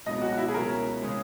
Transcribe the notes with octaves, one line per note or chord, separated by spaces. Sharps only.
C#2 B2 F#3 D#5
F#4
F#4
E4
G#4
C#2 B2 F#3 C#4 E4 A#4
C#3 G#3